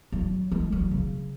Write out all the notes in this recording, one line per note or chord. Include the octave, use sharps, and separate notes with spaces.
F#3
G#3
F#3
C#3